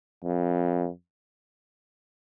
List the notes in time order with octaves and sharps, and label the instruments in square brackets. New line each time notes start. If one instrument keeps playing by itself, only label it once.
[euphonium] F2